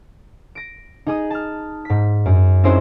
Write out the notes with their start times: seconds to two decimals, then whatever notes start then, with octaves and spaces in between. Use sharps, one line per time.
0.55 A#6 D7
1.07 D#4 G#4 D#6
1.30 A5 F6
1.85 G#2 B6
2.26 F#2
2.64 C4 C#4 D#4 E4 G#4 C5